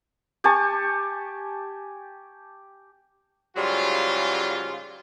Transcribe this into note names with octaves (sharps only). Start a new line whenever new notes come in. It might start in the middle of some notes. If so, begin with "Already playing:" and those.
G4 G#5 A5 C#6
G#2 C#3 F#3 G3 F4